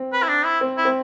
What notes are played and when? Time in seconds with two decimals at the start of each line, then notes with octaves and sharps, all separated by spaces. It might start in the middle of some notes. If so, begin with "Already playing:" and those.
Already playing: C4
0.13 B4
0.22 E4
0.29 D4
0.45 E4
0.61 C4
0.77 E4
0.85 C4